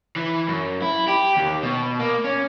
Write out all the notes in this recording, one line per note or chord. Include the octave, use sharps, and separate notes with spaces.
E3
F#2
E4
G4
D#2
B2
A#3
C#4